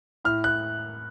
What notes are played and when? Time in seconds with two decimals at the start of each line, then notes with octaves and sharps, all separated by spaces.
0.25 A2 F6
0.44 F#6